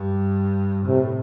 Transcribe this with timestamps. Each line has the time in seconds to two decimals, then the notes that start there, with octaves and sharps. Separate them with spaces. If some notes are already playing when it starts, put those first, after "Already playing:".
Already playing: G2
0.85 A2 C3